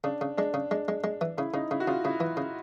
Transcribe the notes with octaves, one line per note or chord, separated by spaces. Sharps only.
C#3 D4
C#3
G#3 D4
C#3
G#3 D4
G#3
G#3
E3
C#3 E4
C#3 D#4
C#3 E4
F#4
C#3 F4
C#3 E4
E3
C#3